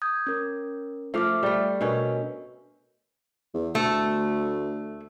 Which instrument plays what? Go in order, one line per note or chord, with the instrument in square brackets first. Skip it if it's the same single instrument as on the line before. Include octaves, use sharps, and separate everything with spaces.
[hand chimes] D#6 G6 G#6
C#4 A#4
[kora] F3 A3 F5 [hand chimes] E5 D6 F6
[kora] G3 A3
[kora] B2 C#4 [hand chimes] D4 A#4
[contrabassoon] E2
[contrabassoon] D2 [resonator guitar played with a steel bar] A3